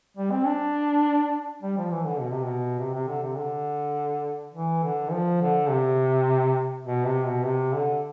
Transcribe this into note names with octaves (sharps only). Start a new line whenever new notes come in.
G3
C4
D4
G3
F3
E3
D3
B2
C3
B2
C3
C3
D3
C3
D3
E3
D3
F3
D3
C3
B2
C3
B2
C3
D3